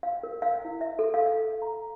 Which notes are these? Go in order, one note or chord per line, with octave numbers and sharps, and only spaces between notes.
F5
A#4
F5
E4
E5
A4
F5
F5
A#5